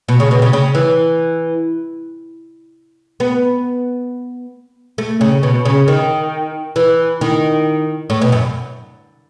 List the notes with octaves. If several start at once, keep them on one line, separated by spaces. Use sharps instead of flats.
B2
C#3
B2
C#3
C#3
E3
B3
A3
C#3
B2
C#3
D#3
E3
D#3
A2
B2
F#2